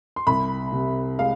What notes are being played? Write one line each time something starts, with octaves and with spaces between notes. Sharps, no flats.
C6
C2 B5
C3
G#3 F5